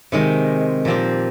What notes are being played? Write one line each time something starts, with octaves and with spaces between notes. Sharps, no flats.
C3 D#3 G#3
A#2 F3 C4 G4